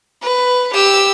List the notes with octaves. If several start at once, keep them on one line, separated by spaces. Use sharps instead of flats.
B4
G4 E6